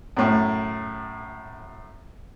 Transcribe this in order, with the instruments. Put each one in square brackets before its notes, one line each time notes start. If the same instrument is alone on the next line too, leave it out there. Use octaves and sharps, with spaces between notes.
[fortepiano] F#2 A2